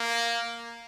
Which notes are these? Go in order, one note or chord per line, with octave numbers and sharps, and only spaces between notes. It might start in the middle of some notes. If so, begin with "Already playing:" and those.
Already playing: A#3